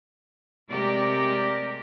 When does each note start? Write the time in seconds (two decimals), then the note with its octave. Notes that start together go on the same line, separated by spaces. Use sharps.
0.69 C3 G#3 A3 G4 A#4 D5